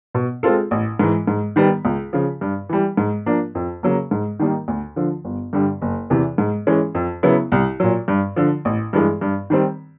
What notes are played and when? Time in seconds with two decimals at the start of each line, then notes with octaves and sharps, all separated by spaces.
0.15 B2
0.43 G#3 C4 F4 A4
0.71 A1
0.99 G#2 E3
1.27 G#2
1.56 D#3 G3 B3
1.85 C#2
2.13 C#3 F3
2.41 G2
2.69 E3 G3
2.97 G#2
3.26 F3 A#3 D4
3.55 F2
3.83 C#3 F#3 A#3
4.11 G#2
4.40 D#3 G3 A#3 D#4
4.68 D2
4.96 D3 F3
5.25 G1
5.53 G2 D3 G3
5.82 F#1
6.10 E2 C3 E3
6.38 G#2
6.67 E3 G#3 C#4
6.95 F2
7.23 C#3 F#3 B3 E4
7.52 C2
7.80 A#2 F#3
8.08 G2
8.36 D3 F3
8.65 A1
8.93 G2 E3 G#3
9.21 G2
9.50 D#3 G3 C4